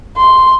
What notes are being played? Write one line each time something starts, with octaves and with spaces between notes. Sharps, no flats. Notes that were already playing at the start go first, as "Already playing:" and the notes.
C6